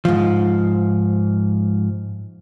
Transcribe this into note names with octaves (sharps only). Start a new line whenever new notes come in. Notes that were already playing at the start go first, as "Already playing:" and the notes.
G#2 F3